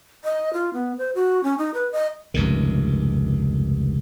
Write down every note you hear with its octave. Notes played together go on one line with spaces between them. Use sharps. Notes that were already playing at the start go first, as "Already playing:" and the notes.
D#5
F4
B3
C5
F#4
C#4
D#4
B4
D#5
F1 C#2 G2 D#3